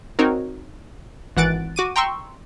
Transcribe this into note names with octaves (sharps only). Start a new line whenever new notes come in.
C4 D#4 F#4 A#4 C#5
G#1 E3 F#5 F#6 A6 D7
F#4 D6 D#7
G5 A#5 C6 C#6 E6